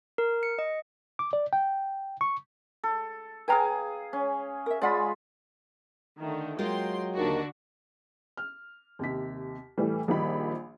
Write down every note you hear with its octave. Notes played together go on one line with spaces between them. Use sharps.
A#4
C#7
D#5
D6
D5
G5
C#6
A4
G#4 B4 F5 G5 G#5 A#5
C#4
A#4 E5
G#3 F4 D5 F#5 B5
D3 D#3 A3
F#3 G#3 A#3 F4 G5 C6
D#2 D3 D#3 D4 F#4
F6
D#2 C3 B6
A2 E3 G3 A3
A#1 D#3 G3 A#3 B5